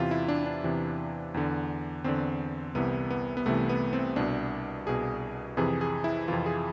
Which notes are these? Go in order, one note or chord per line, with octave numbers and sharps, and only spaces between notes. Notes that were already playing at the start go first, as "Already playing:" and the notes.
Already playing: E2 C3 E3 F4
E4
D4
D4
E2 C3 E3
E2 D3
E2 D3 C4
C2 C3 E3 B3
B3
B3
C2 C3 E3 A3
B3
C4
C2 B2 D4
C2 B2 G#4
F2 C3 E3 G#4
G#4
E4
F2 C3 E3 F4
G#4